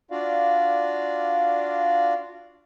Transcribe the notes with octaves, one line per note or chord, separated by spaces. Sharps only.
D4 F4 F#4 D5 F5